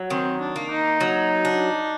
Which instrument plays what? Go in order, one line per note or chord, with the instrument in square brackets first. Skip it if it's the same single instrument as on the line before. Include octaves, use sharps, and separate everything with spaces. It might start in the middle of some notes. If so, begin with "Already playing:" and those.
Already playing: [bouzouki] F#3
[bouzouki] D#3 [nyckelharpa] C4
[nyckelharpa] D4
[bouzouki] A#3
[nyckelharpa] D#4
[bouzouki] F#3
D4